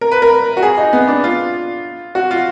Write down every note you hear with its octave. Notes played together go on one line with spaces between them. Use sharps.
A#4
B4
A#4
F#4
G#4
D#4
B3
D4
F4
F#4
F4